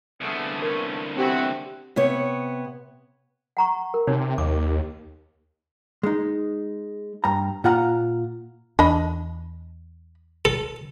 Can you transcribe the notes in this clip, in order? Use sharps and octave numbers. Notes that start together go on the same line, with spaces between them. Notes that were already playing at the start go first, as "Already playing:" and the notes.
C2 D3 A3 B3 G#4
A3 B3 C#4 A#4
B3 C4 D4 E4 F#4 G4
C3 B3 C#5
F#5 A#5 C#6
A#4
C3 D#4 C#5
D#2 D6
G#3 D#4
G2 A#5
A#2 F4 F#5 A#5
E2 D4 D#5 B5
A4